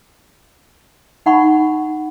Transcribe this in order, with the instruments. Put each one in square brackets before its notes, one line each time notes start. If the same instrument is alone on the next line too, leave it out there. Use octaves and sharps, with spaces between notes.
[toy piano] D#4 F#5 B5 C#6